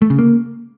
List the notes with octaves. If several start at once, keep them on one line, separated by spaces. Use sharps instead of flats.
A3
C#3
A#3